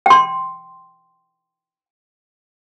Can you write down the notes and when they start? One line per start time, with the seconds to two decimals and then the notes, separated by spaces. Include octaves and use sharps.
0.06 G5 C6